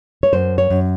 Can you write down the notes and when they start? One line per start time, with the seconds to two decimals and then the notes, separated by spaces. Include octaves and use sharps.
0.23 C#5
0.33 F#2 C5
0.58 C#5
0.70 F#2